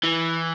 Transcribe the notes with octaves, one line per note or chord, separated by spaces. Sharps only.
E3